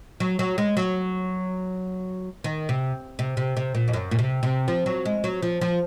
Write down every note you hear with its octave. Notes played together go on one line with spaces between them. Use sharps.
F#3
F#3
G#3
F#3
D#3
C3
C3
C3
C3
A#2
F2
F#2
A#2
C3
C3
F3
F#3
G#3
F#3
F3
F3